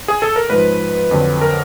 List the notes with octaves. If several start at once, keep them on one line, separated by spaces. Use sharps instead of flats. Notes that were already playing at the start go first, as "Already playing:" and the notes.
G#4
A4
A#4
G#2 F3 B4
F2 D3 F#3
A#4